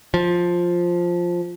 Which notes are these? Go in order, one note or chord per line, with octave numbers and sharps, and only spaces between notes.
F3